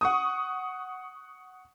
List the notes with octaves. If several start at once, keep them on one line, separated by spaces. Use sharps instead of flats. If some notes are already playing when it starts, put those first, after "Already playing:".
F#5 C#6 D#6